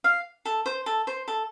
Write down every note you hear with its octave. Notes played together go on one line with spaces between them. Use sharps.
F5
A4
C5
A4
C5
A4